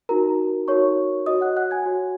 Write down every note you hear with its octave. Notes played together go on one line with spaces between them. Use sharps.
D#4 F#4 A#4 A#5
D#4 F#4 A#4 C#5 C#6
F#4 C#5 D#5 D#6
F#5 F#6
F#5 F#6
G#5 G#6
F#4 C#5